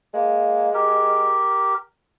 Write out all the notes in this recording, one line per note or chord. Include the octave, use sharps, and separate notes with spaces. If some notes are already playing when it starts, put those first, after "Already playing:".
G#3 A#3
G4 A#4